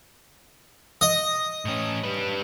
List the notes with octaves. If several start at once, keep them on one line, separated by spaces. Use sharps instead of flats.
D#5
A2 C#4
G3 B4